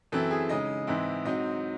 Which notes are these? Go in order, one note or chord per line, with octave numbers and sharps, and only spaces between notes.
F#2 E3 C4 E4 A4
G#4
C#3 G#3 D#4 D#5
G#2 E3 C4 E4
G#2 F#3 C4 D#4 D#5